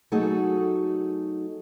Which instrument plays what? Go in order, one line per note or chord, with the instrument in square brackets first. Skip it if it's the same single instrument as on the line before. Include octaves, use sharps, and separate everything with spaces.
[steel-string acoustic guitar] F#3 A3 D#4 F#4 G#4 A4